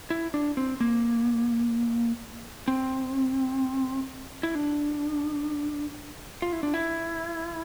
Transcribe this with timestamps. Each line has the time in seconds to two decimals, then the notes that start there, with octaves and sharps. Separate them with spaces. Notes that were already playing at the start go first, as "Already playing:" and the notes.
0.10 E4
0.34 D4
0.57 C4
0.80 A#3
2.68 C4
4.43 E4
4.55 D4
6.42 F4
6.53 E4
6.63 D4
6.74 E4